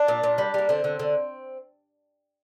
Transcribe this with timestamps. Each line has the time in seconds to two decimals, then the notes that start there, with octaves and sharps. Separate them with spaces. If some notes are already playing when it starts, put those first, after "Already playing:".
Already playing: D4
0.08 A#2
0.24 A#2
0.38 G3
0.54 G3 A#3
0.69 D3 C4
0.84 D3
0.99 D3